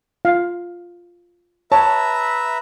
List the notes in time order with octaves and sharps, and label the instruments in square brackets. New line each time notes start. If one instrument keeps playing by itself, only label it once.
[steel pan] F4 F5
[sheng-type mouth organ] B4 E5 A#5 [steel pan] C#5 [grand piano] A5